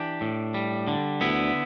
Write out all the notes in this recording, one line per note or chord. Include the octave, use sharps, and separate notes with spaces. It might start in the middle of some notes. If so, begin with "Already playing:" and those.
Already playing: E3 D4 G4
A2
G3
D3
D2 B3 E4